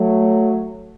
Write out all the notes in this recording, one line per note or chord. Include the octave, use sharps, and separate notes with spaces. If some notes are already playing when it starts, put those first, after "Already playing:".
Already playing: F#3 A3